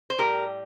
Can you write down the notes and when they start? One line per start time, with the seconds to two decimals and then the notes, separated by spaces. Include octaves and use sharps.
0.10 C5
0.18 A2 G3 G4 A#4